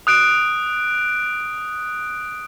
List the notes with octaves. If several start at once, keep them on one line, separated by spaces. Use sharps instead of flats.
D#6 F#6 D7